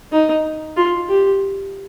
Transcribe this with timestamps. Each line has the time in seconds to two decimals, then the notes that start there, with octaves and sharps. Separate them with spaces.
0.12 D#4
0.77 F4
1.09 G4